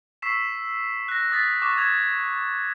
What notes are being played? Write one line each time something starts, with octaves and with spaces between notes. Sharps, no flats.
C#6 E6 B6 C7 E7
F#6 A#6
D#6 A6 B6
C#6 D6 F#6
D#6 G#6 F7